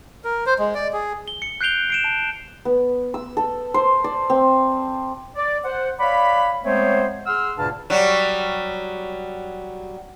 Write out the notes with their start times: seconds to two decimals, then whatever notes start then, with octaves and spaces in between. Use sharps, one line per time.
0.24 A#4
0.46 C5
0.59 G#3
0.75 D5
0.93 G#4
1.28 G7
1.42 C#7
1.61 F#6 G6 C7 D7 F7 G7
1.90 C7 D7 E7
2.04 A5
2.65 B3
3.14 E6
3.37 A4
3.74 C5
4.04 D5
4.30 C4
5.36 D5
5.65 C5 F#5
5.99 C#5 D5 F5 F#5 B5
6.64 G#3 A3 B3 C4 C5 C#5
7.26 G#4 F#5 C6 E6 F6
7.58 D2 G2 A#2 C#3 A5 F6
7.90 F#3 G3 F#4